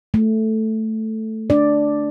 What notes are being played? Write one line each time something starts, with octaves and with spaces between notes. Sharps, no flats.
A3
D4 D5